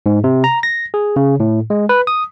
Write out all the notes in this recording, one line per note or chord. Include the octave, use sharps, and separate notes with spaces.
G#2
C3
A#5
A#6
G#4
C#3
A2
G#3
B4
D#6